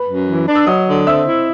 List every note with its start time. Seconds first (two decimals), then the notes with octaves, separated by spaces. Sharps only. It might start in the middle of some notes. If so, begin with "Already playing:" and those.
Already playing: B4 B5
0.09 F#2
0.28 E3
0.48 D4
0.55 E6
0.67 F#3 D#5 D#6
0.87 D3
1.07 C4 E5 E6
1.27 E4